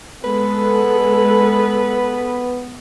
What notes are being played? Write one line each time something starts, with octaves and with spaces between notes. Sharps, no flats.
G#3 B3 A4 B4